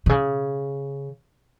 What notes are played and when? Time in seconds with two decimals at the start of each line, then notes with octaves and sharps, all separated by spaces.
0.06 B2
0.09 C#3